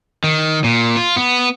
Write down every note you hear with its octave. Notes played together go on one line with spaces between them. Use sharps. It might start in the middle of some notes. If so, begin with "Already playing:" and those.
D#3
A#2
F4
B3